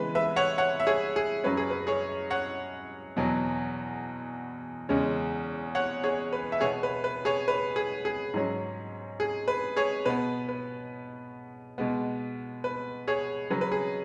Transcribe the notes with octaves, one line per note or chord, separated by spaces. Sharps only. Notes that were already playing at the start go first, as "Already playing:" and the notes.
Already playing: C#3 E3 G#3 B3 B4
B4 E5
C#5 F#5
C#5 F#5
E5
G#4 C#5
G#4
F#2 F#3 C#4 B4
G#4
B4
G#4 C#5
C#5 F#5
E2 B2 F#3 B3
E2 C#3 G#3 C#4
C#5 F#5
G#4 C#5
B4
E5
B2 B3 G#4 C#5
B4
B4
G#4 C#5
B4
G#4
G#4
G#2 F#3 C#4
G#4
B4
G#4 C#5
B2 B3 B4
B4
B2 G#3 B3
B4
G#4 C#5
C#3 F#3 C#4 B4
B4
G#4